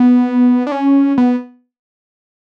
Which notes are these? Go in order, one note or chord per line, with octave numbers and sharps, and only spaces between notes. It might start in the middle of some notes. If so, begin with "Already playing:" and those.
Already playing: B3
D4
C#4
B3